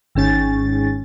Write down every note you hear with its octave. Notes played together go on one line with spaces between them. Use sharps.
G#1 G#2 C#4 A6